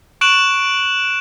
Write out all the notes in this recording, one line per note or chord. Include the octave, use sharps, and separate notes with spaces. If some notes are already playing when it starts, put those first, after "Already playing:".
C#6 F#6 D7 E7 F#7